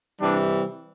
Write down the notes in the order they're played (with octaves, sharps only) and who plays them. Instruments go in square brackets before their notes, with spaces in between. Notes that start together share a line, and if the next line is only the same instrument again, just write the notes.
[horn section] C3 E3 G3 D4